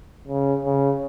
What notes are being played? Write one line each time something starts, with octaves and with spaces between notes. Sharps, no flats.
C#3
C#3